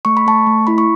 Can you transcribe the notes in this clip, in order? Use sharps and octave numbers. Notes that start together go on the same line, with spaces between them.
A3 C#6
B5
A3 A5 C#6
A3
E4 B5
C#6